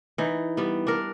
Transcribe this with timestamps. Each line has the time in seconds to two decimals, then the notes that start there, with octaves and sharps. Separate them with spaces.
0.18 E3 D#4
0.57 G3 B3
0.87 D4 A#4